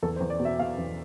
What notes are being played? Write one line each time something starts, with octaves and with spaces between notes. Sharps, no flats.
E2 A4
C5
E2
D5
B2
E5
B2 F5
E2